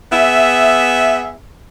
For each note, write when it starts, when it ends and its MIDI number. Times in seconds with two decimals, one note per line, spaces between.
0.12 1.31 59
0.12 1.31 68
0.12 1.31 76